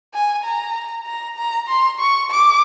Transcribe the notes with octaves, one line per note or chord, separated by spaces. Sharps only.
G#5
A#5
A#5
A#5
C6
C#6
D6